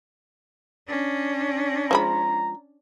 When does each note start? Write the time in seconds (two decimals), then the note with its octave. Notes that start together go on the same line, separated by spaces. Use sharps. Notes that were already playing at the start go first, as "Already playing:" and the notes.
0.88 C#4 D4
1.91 F3 G#3 A#5 B5